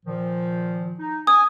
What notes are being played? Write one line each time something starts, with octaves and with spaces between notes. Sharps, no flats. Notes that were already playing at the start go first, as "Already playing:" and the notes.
A#2 D#3 F3
D#4
G#5 D#6